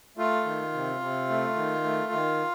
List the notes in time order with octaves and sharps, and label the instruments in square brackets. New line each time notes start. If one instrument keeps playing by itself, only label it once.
[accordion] A3 F4
D#3
C3
C3
A3
D#3
A3
D#3